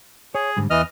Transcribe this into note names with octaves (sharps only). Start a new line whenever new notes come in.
G#4 C#5
G#2 D3 G3
E2 E3 D#5 F6